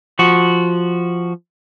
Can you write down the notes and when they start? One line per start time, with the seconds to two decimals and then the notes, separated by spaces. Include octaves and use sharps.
0.19 F3 F#4